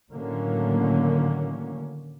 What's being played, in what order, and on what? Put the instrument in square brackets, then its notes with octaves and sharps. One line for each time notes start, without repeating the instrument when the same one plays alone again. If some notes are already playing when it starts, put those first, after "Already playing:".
[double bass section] A2 D3 D#3 F#3 A#3 C#4